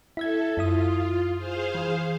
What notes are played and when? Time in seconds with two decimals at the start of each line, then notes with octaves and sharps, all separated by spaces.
0.17 E4 A4 E5 G#6
0.57 F#2 E4 F4 D#6
1.37 G#4 C5 F5
1.75 E3